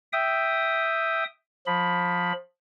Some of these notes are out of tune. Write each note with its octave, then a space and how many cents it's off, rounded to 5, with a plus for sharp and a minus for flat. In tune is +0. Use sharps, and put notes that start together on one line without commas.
E5 +0 G5 +0 D#6 +0
F3 +20 B5 +0